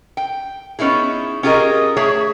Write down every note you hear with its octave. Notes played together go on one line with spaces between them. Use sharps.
G5
B3 C#4 D#4 E4 G#4
C#4 F4 G4 G#4 A#4 D#5
A3 G#4 C#5 E5